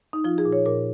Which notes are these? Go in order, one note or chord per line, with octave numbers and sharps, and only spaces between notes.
D#4
F3 F4
G#4
A#2
C#5
A#2 A#4